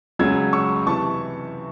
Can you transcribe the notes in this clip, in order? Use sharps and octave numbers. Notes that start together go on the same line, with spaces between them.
C#2 C#3 F#3 C#4 E6 G#6
C#6 E6
C3 E3 A5 C#6